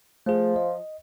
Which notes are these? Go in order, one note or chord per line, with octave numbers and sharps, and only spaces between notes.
F3 A3 G#4
D#5